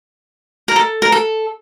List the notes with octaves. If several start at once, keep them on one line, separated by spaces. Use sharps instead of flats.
A#4
A4
A#4
A4